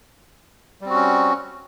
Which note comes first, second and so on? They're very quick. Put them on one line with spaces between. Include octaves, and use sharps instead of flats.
G3 C4 F#4 C#4